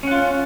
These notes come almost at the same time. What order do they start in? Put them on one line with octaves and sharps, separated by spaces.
C#4 F#5 F4